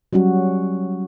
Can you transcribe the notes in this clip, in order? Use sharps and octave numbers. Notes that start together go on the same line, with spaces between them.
F#3 G3 C#4 F#4